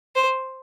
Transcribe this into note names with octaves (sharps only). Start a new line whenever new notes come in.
C5